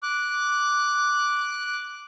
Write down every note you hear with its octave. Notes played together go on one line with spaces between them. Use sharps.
D6 F#6